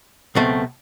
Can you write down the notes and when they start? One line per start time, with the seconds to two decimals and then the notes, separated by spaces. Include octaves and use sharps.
0.35 C#2 B2 F#3 A3 C4